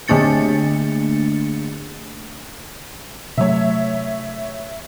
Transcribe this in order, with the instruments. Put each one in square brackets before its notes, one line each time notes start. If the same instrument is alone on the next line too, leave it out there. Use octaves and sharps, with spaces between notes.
[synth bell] D3 A3 A#3 D4 A6 C#7
[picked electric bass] C3 F#3 A3 [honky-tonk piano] C#5 E5